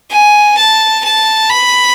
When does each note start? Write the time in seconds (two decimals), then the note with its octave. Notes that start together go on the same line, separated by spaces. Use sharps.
0.11 G#5
0.57 A5
1.04 A5
1.50 B5